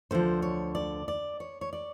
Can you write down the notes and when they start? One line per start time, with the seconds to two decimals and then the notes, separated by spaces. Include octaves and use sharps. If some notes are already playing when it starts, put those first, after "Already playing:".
0.11 D2 D3 F3 C5
0.42 C#5
0.75 D5
1.08 D5
1.40 C#5
1.61 C#5
1.73 D5